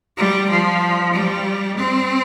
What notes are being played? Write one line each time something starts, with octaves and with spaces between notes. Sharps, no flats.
G3
F3
G3
C4